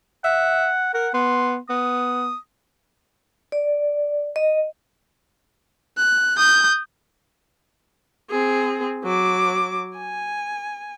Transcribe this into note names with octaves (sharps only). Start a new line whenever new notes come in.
E5 F#5
A#4 F#5
B3 C6
B3 D#6
D5
D#5
F#6
D#6 G6
C4 G#4
F#3 D6
G#5